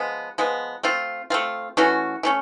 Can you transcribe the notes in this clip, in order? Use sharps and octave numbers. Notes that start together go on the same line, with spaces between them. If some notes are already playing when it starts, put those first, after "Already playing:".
Already playing: F3 G#3 B3
F3 G#3 B3
A3 C4 F4
A3 C4 F4
E3 A3 C#4 F#4
E3 A3 C#4